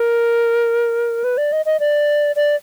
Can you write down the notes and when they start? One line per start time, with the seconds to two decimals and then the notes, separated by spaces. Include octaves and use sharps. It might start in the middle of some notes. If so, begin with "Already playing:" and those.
Already playing: A#4
1.24 B4
1.38 D5
1.52 D#5
1.66 D#5
1.80 D5
2.36 D5